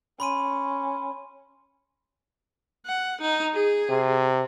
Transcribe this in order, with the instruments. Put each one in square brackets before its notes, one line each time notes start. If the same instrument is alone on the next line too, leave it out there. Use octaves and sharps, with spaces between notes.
[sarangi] C#4 [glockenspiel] B5 C6 D#7
[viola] F#5
D#4
G#4
[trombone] C3